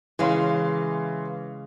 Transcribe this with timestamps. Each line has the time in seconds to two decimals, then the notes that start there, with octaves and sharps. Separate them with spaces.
0.19 C#3 E3 G#3 F5 C6